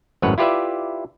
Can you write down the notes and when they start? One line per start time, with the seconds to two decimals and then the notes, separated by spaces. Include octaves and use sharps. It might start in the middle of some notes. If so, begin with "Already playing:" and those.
0.22 G#1 F#2 A2 B4 C#5 F#5
0.38 E4 F4 G4 B4 D5 E5